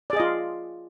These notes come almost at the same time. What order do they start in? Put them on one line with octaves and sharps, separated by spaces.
D5 G#4 D#5 F4